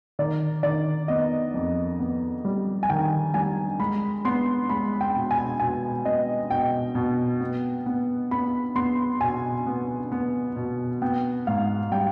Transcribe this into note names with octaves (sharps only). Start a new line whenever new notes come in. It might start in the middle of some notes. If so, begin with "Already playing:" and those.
D#3 D5
D#3 D5
B3 D#5
F2
B3
G3
G#5
D#3 G5
G3 G#5
G#3 B5
B3 C6
G#3 B5
G5
B2
G#5
B2 G#5
B3 D#5
B2 G5
B2
B3
B3
B3 B5
B3 C6
B2 G#5
B3
B3
B2
B3 G5
G#2 F5
G3 G5